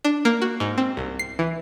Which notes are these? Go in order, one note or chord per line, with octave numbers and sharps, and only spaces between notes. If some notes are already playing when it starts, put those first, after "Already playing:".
D4
A#3
F#4
G#2
C4
C2
C7
E3